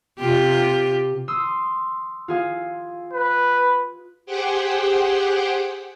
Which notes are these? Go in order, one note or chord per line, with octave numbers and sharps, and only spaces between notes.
C3 F4 G4
C6 D#6 E6
F4 G#4 F5
B4
G4 G#4 C5 F#5 G5